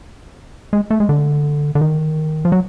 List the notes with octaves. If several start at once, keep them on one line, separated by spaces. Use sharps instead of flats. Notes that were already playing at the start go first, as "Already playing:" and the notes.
G#3
A3
G#3
D3
D3
D#3
F3
F#3